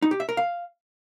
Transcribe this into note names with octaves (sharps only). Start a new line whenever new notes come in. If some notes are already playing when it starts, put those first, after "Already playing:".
D#4
G4
E5
A#4
F5